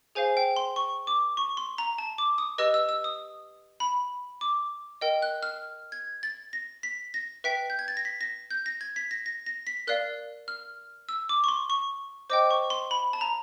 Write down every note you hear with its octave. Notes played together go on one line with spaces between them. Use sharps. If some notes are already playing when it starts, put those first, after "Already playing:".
G#4 C5 F5 G#5
G5
C6
C#6
D6
C#6
C6
A#5
A5
D6
D#6
G4 B4 D#5 E6
E6
E6
D#6
B5
D6
A#4 D#5 G5
F#6
F6
G#6
A6
A#6
B6
A#6
B4 E5 G5 B6
G6
G#6
A6
A#6
B6
A#6
G6
A#6
G#6
B6
A#6
A#6
A#6
B6
A#4 D5 F5 F#6
F6
E6
D6
C#6
C6
C#6
C5 D#5 G5 D6
C#6
C6
B5
A5
A#5